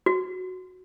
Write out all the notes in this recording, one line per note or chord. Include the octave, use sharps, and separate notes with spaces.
F#4